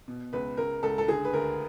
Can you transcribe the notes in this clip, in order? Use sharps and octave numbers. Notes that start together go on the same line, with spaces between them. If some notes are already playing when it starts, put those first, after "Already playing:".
B2
C#2 B4
C#2 A#4
C#2 A4
A4
D3 G#4
B4
D2 A#4